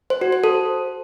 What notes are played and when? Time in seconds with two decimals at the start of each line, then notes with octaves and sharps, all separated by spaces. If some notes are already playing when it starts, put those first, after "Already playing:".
0.10 C5
0.21 F#4
0.32 C5
0.44 A4